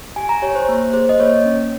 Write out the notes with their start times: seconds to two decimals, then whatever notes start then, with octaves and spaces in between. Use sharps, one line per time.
0.16 G4 G#5
0.29 A#5
0.42 G4 C#5
0.55 C5
0.69 A#3
0.93 G#4 C5
1.09 D#5
1.20 A#3 C#5
1.45 C#4